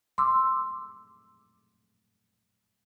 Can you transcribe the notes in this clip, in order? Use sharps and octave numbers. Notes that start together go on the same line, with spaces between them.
C6 D6 E6